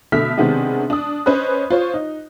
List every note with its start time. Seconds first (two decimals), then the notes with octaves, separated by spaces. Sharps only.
0.12 B2 D3 A3 E5 F6 B6
0.37 C3 D#3 G#3 B3 C4 D4
0.90 D4 D#6
1.26 C#4 B4 C5 D#5 B5 F#6
1.70 F4 C5 C#5
1.94 D#4